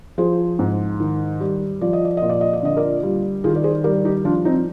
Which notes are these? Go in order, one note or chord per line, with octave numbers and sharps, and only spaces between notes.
F3 G#4 C5
G#2
D#3
G3
F3 D5
D#5
D5
A#2 D#5
D5
D#5
D5
D3 D#5
A#4 D5
G3
D#3 F4 G#4
D5
G#4 C5
G3 A#4 D5
D#4 G4
F3 D4 F4
C4 D#4